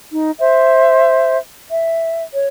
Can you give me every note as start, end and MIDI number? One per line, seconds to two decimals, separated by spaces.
0.14 0.31 63
0.40 1.38 72
0.40 1.38 76
1.70 2.22 76
2.34 2.48 73